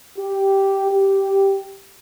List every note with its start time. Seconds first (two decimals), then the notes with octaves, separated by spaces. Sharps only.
0.18 G4
0.92 G4